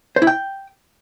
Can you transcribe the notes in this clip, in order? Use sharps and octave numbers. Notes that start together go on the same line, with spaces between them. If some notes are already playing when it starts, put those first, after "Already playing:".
C5
E4
G5